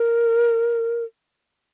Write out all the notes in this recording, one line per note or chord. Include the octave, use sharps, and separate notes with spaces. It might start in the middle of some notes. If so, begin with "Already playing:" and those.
Already playing: A#4